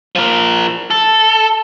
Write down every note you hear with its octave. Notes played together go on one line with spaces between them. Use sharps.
F3 A#4
A4